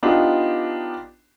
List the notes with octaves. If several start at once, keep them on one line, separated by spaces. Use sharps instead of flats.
B3 D4 D#4 F4 G4